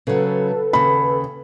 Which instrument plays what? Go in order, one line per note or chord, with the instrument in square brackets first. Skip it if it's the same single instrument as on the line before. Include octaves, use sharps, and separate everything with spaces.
[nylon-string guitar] C#3 F#3 [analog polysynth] A4 B4
[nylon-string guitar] D#2 C#3 [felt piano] B5